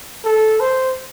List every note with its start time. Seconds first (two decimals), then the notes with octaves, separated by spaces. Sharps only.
0.24 A4
0.60 C5